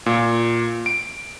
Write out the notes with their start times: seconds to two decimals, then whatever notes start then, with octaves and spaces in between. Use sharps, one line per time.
0.06 A#2
0.86 D7